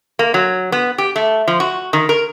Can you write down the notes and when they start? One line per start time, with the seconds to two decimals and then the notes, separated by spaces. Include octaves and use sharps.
0.19 A#3
0.34 F#3
0.72 B3
0.98 G4
1.16 A3
1.48 F3
1.60 F#4
1.93 D#3
2.09 A#4